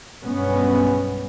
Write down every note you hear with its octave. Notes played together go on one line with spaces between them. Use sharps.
B1 G2 G#3 B3 C#4